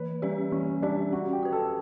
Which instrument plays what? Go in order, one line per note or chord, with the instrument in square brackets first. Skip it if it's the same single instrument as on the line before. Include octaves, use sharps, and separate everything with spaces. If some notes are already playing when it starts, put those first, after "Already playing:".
Already playing: [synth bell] E3 [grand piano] B4
[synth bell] G3 C#4 G4 D5
[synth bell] E3 [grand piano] C#4
[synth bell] G3 C#4 G4 D5 [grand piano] D4
[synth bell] C#4 [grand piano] F#4
[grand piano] G4
[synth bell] F#4 B4
[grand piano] A4